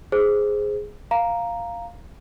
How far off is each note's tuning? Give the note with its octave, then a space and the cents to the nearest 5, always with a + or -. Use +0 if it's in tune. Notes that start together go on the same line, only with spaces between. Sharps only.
G#4 +0 C5 +0
F5 +0 A#5 +0